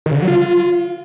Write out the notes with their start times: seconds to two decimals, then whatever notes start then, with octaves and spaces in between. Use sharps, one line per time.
0.06 D#3
0.11 C#3
0.17 D3
0.22 F#3
0.28 F4